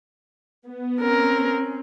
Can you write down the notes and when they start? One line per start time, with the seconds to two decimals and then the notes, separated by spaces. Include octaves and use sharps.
0.66 B3
1.01 C4 C#4 A#4